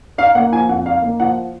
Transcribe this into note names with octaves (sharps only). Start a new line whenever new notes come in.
D#4 F5
A#3 F#5
F3 G#5
F2 F#5
D#4 F5
A#3
F3 F#5